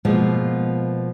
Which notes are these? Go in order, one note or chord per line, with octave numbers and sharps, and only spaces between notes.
B2 F3 G#3 A#3 B3